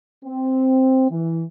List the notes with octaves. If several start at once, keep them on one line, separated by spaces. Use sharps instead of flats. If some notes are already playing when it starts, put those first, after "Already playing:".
C4
E3